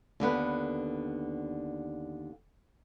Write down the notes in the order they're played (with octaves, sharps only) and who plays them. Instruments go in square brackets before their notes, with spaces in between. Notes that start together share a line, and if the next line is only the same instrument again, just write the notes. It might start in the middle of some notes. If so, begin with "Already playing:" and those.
[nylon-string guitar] D#2 D3 B3 B4